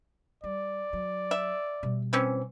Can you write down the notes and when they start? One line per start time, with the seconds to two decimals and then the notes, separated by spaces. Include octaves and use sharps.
0.44 G3 D5
0.93 F#3
1.31 E5
1.83 B2 G3
2.13 E3 C4 C#4